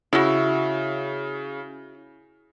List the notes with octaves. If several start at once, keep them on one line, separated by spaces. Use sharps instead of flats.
C#3 E4 F#4